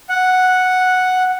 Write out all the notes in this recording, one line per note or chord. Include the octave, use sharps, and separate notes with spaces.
F#5